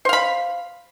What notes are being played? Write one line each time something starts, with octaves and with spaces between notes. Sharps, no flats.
C5 F5 B5